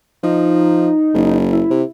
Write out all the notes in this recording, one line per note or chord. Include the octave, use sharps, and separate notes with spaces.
F3 D#4
F#1
E4
C3